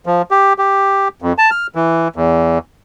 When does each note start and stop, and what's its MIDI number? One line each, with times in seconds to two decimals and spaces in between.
0.06 0.22 53
0.31 0.53 67
0.58 1.08 67
1.22 1.33 41
1.38 1.50 81
1.51 1.67 89
1.75 2.08 52
2.16 2.58 40